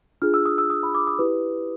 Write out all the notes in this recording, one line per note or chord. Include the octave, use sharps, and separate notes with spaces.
D4 F4 G#4 F6
E6
D#6
E6
D#6
B5
D6
D#6
E4 G4 B4